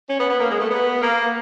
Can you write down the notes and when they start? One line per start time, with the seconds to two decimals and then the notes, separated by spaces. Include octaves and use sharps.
0.10 C#4
0.19 B3
0.30 B3
0.40 A#3
0.50 G#3
0.61 A3
0.71 B3
1.01 A#3